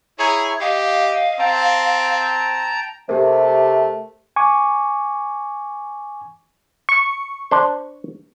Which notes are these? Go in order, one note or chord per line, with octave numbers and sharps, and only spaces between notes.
E4 G#4 C#5 A#5 C#6
G4 D#5 F5
C4 G5 A5 A#5
C3 A3 G4 A#4
G#5 C#6 D6
C#6
D4 C5